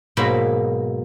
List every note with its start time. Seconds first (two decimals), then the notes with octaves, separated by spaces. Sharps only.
0.17 G#2 B2 F#3 A#3 B5